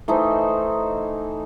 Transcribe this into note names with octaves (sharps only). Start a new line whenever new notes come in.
E3 A3 D#4 C5